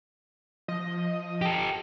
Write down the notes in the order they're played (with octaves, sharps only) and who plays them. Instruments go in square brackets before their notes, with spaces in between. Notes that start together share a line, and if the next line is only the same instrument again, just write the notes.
[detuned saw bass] F3 [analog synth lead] D#5
[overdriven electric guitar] G4 A4